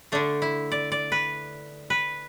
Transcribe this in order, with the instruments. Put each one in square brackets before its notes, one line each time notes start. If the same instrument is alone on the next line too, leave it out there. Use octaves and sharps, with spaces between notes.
[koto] D3 A3 D4
E4
D5
D5
B4
B4